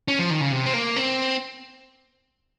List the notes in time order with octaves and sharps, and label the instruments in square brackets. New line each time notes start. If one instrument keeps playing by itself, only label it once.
[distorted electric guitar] C#4
F3
D#3
C#3
C3
C4
A#3
C4